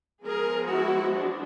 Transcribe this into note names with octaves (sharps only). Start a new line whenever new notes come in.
F3 G#3 B3 G#4 A#4
E4 F#4
D4